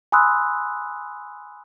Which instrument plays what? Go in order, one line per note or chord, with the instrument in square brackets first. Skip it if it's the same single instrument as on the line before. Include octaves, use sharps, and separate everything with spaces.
[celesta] G#5 B5 C6 D#6 E6 F#6